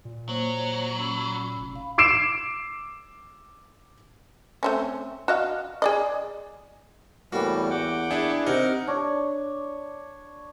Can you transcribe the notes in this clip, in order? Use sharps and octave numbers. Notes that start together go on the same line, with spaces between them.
A#2
F#3 A#3 C5 C#5
C#4 B5 E6
F1
F5 B5
D6 E6 C7 D7 E7
A3 C4 C#4
F#4 D#5 F5
G#4 D5 D#5
E2 A2 E3 G3 A#3 F#4
F#5 G5 D6
D4 E4 G#4
C3 D#4 A#4 F#5
D4 C#5